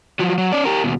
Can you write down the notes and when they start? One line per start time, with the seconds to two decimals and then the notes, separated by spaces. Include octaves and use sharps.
0.19 F3 F#3
0.38 F#3
0.53 C#4 D5
0.65 G4 A#4
0.84 D#2 B2